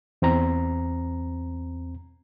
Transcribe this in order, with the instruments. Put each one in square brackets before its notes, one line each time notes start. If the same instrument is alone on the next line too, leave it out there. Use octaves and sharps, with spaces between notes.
[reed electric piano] E2 C4 A#5